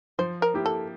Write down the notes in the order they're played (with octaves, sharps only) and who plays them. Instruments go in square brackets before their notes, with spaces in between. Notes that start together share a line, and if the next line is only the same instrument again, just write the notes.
[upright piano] F3 [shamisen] C5
[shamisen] A#4
[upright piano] A#3 E4 G4
[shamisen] A4